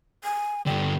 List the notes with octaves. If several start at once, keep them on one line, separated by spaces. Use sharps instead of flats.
G#5
G2 D3 G5